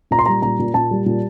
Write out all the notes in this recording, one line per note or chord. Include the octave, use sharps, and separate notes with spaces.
A#2 A#5
C6
G3 A#5
A#2 A#5
A#2
A#2 A5
G3
A#2